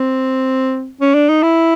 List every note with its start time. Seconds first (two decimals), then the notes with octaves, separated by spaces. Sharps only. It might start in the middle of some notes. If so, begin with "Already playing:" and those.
Already playing: C4
1.01 C#4
1.15 D4
1.29 D#4
1.43 E4